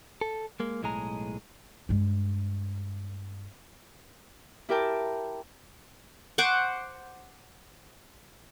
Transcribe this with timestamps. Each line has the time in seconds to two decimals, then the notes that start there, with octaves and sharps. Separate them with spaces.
0.21 A4
0.60 G#3 A#3
0.83 B1 A2 G#3 G#4 A#5
1.89 G2 G#3
4.69 E4 G4 A#4 G5 A5
6.38 C5 F#5 C#6 D6